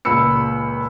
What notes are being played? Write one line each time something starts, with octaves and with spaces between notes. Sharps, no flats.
C#2 A#2 B5 E6 C#7